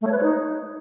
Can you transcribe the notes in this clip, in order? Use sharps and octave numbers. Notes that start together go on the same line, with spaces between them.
A3
C#5
B4
C#5
D#4